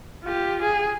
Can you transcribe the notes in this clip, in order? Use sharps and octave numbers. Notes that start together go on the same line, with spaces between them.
F4 G4
G#4